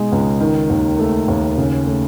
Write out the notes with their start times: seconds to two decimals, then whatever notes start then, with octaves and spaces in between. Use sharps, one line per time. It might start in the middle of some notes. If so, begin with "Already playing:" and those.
Already playing: B2 G#3 D#4
0.12 C#2
0.40 D#3
0.70 D#2
0.99 A3
1.28 D#2
1.57 C#3
1.87 A3